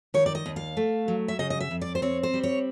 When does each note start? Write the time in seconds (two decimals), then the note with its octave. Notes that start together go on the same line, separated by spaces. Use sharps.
0.14 D#3 C#5
0.26 D5
0.35 D#5
0.46 D#2
0.56 F5
0.77 A3
1.08 F#3
1.28 E5
1.39 C#3 D#5
1.50 D#5
1.60 E5
1.71 F2
1.81 D5
1.95 C5
2.02 C4 C#5
2.23 C5
2.34 G3
2.43 C#5